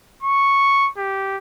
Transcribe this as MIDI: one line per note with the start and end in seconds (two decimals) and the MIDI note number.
0.23 0.90 85
0.98 1.37 67